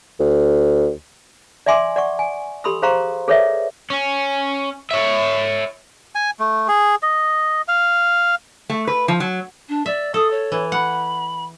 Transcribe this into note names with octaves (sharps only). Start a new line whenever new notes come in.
D2
D5 E5 G#5 C6 D6
D5 F#5 C#6
G#5
G4 A4 B5 C6 D#6 E6
G#4 C5 F5 A#5 C6 C#6
G#4 A4 B4 C#5 D5 E5
C#4
C#5 E5
G#5
A3
G#4
D#5
F5
A3
B4
F3
F#3
D4
D5 E5
A4 D#6
C#5
E3
F#5 B5